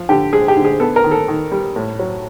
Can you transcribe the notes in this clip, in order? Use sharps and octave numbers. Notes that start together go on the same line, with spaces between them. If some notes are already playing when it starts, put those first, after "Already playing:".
Already playing: F3
D3 G4
G#3 G#4
G4
D3
G#4
B3 A4
A#4
D#3
A4
D#3
G3
A2
F#3